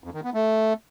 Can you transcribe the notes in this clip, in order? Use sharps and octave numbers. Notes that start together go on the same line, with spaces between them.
F2
D#3
B3
A3